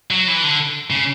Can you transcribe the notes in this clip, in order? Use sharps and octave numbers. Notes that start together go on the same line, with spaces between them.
F#3
E3
D3
C#3